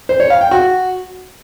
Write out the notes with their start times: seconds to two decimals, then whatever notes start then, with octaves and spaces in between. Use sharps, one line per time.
0.09 C5
0.20 C#5
0.30 F5
0.41 G5
0.51 F#4